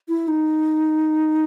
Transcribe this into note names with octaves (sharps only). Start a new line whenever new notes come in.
E4
D#4